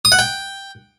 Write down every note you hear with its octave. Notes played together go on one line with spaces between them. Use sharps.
D#6
F#5
G5